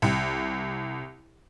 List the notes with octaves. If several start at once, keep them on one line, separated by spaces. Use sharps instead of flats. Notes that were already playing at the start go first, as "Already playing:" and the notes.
C2